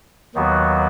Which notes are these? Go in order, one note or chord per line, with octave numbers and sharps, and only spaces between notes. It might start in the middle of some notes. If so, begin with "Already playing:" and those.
D#2 D#3 F#3 B3 F#4